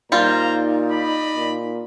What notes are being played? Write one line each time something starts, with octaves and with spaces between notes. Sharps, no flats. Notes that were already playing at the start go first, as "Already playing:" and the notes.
A#2 G3 D#4 F4 C5 A#5
D5 D#5 B5
A#2